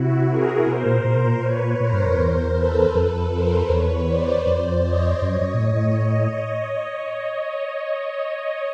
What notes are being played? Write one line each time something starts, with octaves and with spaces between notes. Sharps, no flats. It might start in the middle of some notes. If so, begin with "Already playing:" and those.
Already playing: C3 E4 F#4
G#4 A#4
B2 A#4 C5
A#2
A#2
B2
A#2
B4 C#5
A#2 A#4 C5
G2
F2
E2
A4 B4
F2
A#4 C5
E2 B4 C#5
C5 D5
F2
C#5 D#5
F#2 C#5 D#5
F#2
A#2
A2